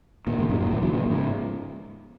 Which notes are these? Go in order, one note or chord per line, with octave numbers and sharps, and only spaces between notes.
A#2 D#3
G#2 C#3
F#2 A#2
F#2 A#2
A#2 D#3
C#3 F#3
A#2 D#3
G#2 C#3